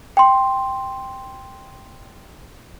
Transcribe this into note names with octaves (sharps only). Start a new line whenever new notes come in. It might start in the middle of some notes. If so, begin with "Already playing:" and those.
G5 C6